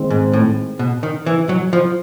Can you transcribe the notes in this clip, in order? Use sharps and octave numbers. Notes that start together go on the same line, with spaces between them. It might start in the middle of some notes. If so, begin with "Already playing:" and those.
Already playing: D#3 G#3 C4
G#2
A2
B2
D#3
E3
F#3
F3